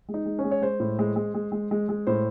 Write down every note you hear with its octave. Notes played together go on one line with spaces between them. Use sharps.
G#3
D#4
G#3
C#4
G#3
C#5
G#3 C5
A2
G#3
G#3
G#3
G#3
G#3
G#3
A2 C5